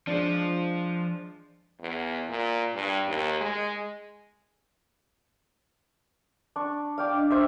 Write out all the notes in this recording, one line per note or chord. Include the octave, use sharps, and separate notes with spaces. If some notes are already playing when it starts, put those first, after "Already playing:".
F3 G#3 D4 F4
E2
A#2
G2
D#2
G#3
D4 C#6
D5 F5 G5 D6
D4 D#5
C5 E5